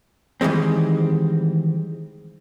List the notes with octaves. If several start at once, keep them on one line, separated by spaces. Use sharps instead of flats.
D#3 E3 G3 G#3 C4